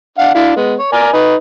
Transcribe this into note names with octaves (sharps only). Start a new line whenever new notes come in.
D4 F5 F#5
D4 E4 F5
G#3 B3
C#5
A#4 D5 G#5
D#4 B4